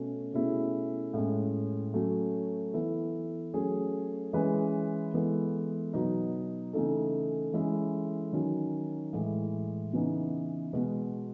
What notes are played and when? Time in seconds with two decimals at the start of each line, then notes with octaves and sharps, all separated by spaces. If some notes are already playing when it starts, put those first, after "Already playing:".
Already playing: B2 A3 C#4
0.34 B2 A3 C#4 E4 G#4
1.14 A2 G#3 C#4
1.94 F#3 A3 C#4
2.74 E3 B3 E4 A4
3.53 F#3 A3 C#4 G#4
4.33 E3 G#3 C#4 G#4 B4
5.14 E3 G#3 B3 E4 A4
5.93 B2 F#3 B3 D#4
6.73 C#3 E3 A3 D#4 A4
7.53 E3 G#3 C#4 E4 A4
8.33 D#3 F#3 C#4
9.13 A2 E3 G#3
9.93 C#3 E3 B3 D#4
10.73 B2 G#3 B3 F#4